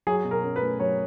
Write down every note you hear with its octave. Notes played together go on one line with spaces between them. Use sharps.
F#3 G#4
B2
A#4
C#4
B4
A3
F#3 C#5